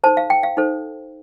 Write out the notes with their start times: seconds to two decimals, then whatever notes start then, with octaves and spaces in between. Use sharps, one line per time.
0.04 D#4 A4 C5 A5
0.17 F5
0.30 G5
0.43 F5
0.57 D#4 A4 C5